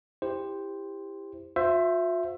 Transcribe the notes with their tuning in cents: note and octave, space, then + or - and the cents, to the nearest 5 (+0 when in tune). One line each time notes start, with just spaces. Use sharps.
E4 +0 G4 +15 C5 +0
F4 +45 C5 +0 E5 +15